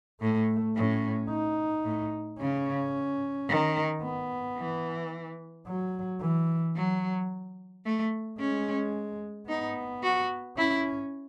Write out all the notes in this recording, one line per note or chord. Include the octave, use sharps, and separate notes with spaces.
A2 A3
A2 C#4
D#4
A2
C#3 C#4
D#3
B3
E3
F#3
E3
F#3
A3
G#3 C#4
B3 D#4
F#4
C#4 E4